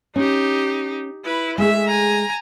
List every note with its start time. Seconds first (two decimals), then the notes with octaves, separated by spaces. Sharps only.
0.16 C#4 D#4 G4
1.25 E4 B4
1.58 G#3 A3 G#4 E5
1.87 G#5 A#5